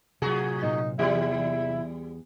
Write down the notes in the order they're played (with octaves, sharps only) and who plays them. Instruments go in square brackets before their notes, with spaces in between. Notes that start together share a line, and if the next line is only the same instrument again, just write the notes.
[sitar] A2 F#4 G#4 [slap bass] C3 F#3
[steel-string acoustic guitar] A#2 [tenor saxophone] D#4
[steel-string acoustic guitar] E2 G#4 [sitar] E3 G3 [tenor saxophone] E4